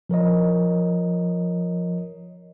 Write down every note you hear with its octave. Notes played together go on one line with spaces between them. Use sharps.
F3 A#4 C#5 D#5